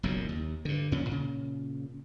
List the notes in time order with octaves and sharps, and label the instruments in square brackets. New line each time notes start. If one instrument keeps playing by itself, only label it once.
[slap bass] F#1 B1 F#2 A#2
D#2
G2 D3
F2 A#2 C#4
A#2 C#3